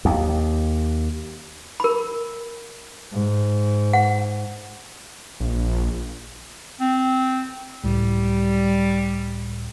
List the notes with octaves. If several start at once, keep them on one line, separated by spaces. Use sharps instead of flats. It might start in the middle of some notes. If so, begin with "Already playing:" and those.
D#2
A#4 B5
G#2
F#5
A#1
C4
C#2 A2 G3